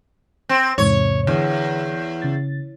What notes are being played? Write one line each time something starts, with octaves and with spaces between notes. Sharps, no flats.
C4
E2 G#2 C3 C#5
E2 D3
C#3 A6